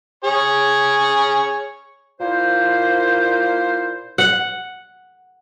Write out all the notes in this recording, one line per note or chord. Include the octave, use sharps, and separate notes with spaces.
G#4 C#5
A#2 A#3 E4 C5
F#5